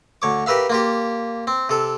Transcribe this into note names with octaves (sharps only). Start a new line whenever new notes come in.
D2 C#5 D6
G4 A#4 B4 E5 F5
A#3 F4 G4
C4
C3 A4